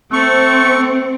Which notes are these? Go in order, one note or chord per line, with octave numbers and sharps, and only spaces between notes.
A3 C4 C#6